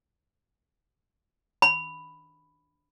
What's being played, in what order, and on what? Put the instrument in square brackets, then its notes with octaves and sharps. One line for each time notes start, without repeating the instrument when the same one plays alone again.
[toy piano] B5